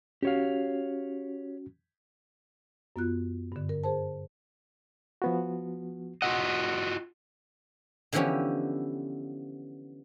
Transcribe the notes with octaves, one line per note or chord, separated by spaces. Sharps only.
C#4 F#4 G4 C#5 F5
F#2 B3 F4 F#6
G2 D3
A#4
G#4 A#4 C5 A5
F3 B3 F#4
F4 F#4 D#5 F#5 E6
D3 E3 F3 B3 C#4 G4